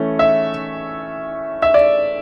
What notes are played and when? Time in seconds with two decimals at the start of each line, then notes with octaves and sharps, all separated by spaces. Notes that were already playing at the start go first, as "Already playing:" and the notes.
Already playing: E3 A3 C#4
0.19 E5
1.62 E5
1.74 D5